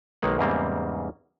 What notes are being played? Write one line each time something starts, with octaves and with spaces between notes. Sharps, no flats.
B1 D#3 G#3 A#3 F#5
E2 G#2 C#3 G3 A#3 C4